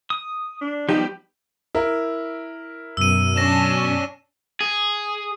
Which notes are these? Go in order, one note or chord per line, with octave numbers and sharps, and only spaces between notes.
D#6
D4
F3 G3 B3 D#4 G4
E4 A#4
F#2 B2 E6 D#7
C#4 D4 A#6 E7
G#4